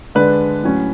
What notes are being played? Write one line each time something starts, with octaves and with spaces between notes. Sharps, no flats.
D3 G#3 D4 B4
A2 F#3 C#4